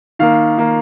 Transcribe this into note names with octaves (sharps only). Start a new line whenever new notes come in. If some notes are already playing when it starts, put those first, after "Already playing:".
D#3 A#3 F5
D#3 A#3